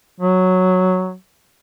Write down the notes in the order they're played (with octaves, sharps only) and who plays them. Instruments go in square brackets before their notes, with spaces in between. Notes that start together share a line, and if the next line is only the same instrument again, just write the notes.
[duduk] F#3